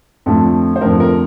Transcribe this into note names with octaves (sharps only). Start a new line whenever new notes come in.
F2 D3 F3 A3 A4
C5
F2 D3 F3 A3 A#4
A#4